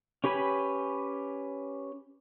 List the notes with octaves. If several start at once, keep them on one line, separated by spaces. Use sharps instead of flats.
C#4 G4 B4 G#5 B5